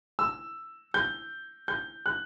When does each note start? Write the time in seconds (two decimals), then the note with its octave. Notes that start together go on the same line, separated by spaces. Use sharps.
0.19 E6
0.94 G6
1.68 G6
2.06 F#6